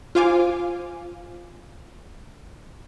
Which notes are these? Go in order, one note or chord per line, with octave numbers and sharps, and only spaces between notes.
F4 C5 F5 G#5 D6